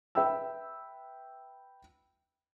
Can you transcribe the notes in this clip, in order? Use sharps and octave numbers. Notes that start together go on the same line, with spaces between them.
B4 E5 G5 B5 E6